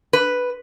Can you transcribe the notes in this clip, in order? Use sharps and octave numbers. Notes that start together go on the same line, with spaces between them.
B4